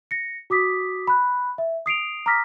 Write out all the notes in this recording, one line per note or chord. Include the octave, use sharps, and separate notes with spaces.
A#6 C#7
F#4 D6 D#6 B6
B5 F#6
E5
D#6 C7 D7 F7
A#5 D6 D#6 F6 A#6 B6